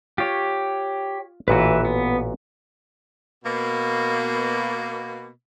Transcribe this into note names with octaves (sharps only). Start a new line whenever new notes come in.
F4 G4 C#5
A1 A#2 E3 F#4 B4
B3
B2 A#3